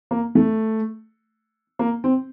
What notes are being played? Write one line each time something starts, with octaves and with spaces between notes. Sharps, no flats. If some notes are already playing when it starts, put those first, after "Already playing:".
A#3
A3
A#3
C4